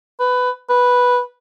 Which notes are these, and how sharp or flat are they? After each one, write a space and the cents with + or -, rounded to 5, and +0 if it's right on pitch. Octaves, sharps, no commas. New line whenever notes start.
B4 +15
B4 -5